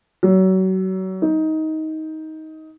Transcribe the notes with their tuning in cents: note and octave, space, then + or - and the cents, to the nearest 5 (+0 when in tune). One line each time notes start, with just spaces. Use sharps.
F#3 +30
D#4 +15